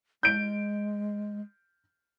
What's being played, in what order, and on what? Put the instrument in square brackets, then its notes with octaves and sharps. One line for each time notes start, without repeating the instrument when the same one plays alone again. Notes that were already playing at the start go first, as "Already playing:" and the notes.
[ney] G#3 [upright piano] G6 D7